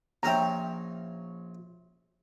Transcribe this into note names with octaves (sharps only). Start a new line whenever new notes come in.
A#1 C#4 E5 G5 A#5